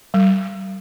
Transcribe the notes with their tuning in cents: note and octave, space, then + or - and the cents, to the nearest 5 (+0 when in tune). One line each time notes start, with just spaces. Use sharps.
G3 -35